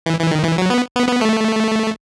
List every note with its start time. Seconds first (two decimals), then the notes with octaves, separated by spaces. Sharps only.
0.06 E3
0.19 E3
0.31 D#3
0.44 E3
0.58 F#3
0.70 B3
0.96 B3
1.08 B3
1.21 A3